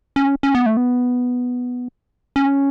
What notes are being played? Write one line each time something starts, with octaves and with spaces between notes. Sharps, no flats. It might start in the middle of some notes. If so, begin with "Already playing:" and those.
C#4
C#4
B3
A3
B3
C#4